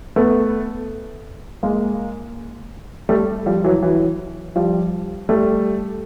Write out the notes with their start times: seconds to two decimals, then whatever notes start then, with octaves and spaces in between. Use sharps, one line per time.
0.16 A3 B3
1.63 G#3 A#3
3.09 G3 A3
3.46 F3 G3
3.64 E3 F#3
3.82 E3 F#3
4.56 F3 G3
5.29 G3 A3